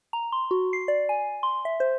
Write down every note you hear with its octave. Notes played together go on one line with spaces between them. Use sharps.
A#5
C6
F#4
C7
D5
G#5
C6
E5
C5